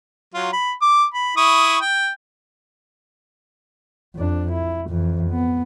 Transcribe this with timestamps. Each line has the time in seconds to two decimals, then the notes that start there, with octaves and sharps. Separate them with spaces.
0.34 F#3 F4
0.53 B5
0.82 D6
1.14 B5
1.37 E4 C#6 D#6
1.81 G5
4.16 F2 D4
4.52 E4
4.90 F2 E3
5.31 B3